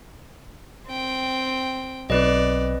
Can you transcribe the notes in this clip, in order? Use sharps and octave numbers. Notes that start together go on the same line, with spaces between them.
C4 G5
B1 C4 B4 D5 D#5